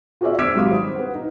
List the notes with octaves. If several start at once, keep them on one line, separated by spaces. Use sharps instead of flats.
F4 F#4 G#4 C5 D5 E5
D6 E6 F6 G#6 B6 D7
G#1 F#3 G3 F5 D#6
C5
B4 F#5
D#4